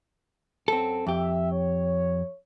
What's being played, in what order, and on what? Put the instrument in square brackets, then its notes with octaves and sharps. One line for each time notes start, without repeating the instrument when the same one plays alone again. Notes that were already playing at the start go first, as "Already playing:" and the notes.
[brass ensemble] F#2 [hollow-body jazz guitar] C4 A4
[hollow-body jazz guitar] F2 G4 [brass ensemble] E5
[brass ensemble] C#5